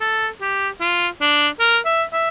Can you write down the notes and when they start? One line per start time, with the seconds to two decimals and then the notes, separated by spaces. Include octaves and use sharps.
0.01 A4
0.41 G4
0.80 F4
1.20 D4
1.60 A#4
1.85 E5
2.13 E5